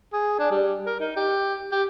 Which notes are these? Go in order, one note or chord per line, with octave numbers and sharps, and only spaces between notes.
G#4
D4
G3
A#4
D#4
G4
G4